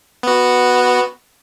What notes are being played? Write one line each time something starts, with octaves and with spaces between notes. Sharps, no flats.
B3 F#4